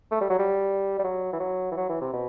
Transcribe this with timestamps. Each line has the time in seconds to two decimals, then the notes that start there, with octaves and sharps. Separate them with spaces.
0.12 A3
0.21 G3
0.30 F#3
0.39 G3
0.99 G3
1.04 F#3
1.33 E3
1.40 F#3
1.72 E3
1.77 F#3
1.89 E3
2.01 C3
2.13 B2